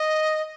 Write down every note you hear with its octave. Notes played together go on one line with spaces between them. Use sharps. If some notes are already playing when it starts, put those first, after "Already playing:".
Already playing: D#5